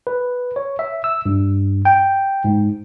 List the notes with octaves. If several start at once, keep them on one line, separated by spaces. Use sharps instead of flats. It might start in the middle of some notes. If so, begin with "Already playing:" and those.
B4
C#5
E5
E6
G2
G5
G#2